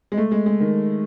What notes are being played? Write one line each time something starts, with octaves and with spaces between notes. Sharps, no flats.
G#3
A3
G#3
G#3
D#3